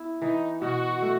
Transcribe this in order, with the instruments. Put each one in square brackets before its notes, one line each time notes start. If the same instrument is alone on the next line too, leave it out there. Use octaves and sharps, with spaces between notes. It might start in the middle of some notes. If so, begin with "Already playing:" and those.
Already playing: [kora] B3 E4
[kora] E3 [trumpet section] D#4
[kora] B2 [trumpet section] F#4
[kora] A3